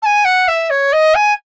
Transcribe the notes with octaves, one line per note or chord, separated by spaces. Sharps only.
A5
G#5
F#5
E5
C#5
D#5
G#5